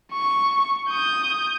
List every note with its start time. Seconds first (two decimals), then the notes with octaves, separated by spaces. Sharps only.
0.13 C#6
0.89 D#6 G6